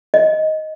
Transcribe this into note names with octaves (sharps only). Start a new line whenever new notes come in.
D#5